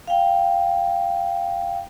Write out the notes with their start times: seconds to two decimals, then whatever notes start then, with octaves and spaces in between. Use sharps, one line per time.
0.07 F5 G5